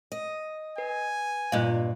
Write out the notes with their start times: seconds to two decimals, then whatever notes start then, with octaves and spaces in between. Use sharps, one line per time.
0.12 D#5
0.78 B4 G#5
1.52 G2 A#2 F4 D#5 F5